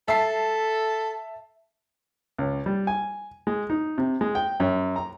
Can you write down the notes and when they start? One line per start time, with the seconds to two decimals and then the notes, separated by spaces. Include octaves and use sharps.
0.08 A4 E5 A5 C7
2.38 C#2
2.66 G3
2.87 G#5
3.47 G#3
3.70 D#4
3.98 C3
4.21 G#3
4.35 G5
4.60 F#2
4.96 A#5